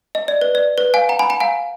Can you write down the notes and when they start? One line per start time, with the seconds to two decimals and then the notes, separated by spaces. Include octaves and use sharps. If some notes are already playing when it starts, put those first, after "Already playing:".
0.15 D#5
0.28 D5
0.41 B4
0.55 D5
0.78 B4
0.94 F5 G#5
1.09 F#5 A#5
1.19 G#5 B5
1.30 F#5 A#5
1.40 F5 G#5